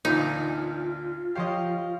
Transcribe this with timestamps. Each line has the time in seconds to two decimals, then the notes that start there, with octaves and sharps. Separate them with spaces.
0.05 D2 A#2 E3 D#4 F4
1.35 F3 G4 C#5 D#5 F5